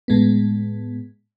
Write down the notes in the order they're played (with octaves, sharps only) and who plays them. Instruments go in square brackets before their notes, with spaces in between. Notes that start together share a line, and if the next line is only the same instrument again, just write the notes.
[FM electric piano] A2 G#3 B3